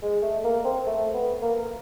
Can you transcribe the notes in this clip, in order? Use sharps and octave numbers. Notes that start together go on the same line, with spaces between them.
G#3
A3
A#3
C4
A3
B3
A#3